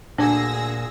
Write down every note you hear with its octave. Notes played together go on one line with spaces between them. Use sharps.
D2 A#2 D3 D4 G#4 G#5 E6 A#6